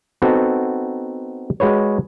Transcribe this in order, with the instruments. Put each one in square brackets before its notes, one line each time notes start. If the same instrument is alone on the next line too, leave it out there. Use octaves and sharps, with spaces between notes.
[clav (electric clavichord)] B3 C4 D#4 F#4 A4
G#3 F#4 B4 C#5